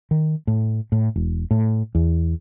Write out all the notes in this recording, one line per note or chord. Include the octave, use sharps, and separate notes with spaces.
D#3
A2
A2
E1
A2
E2